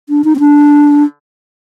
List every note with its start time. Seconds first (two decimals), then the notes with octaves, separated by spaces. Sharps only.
0.09 D4
0.24 D#4
0.35 C4
0.40 D4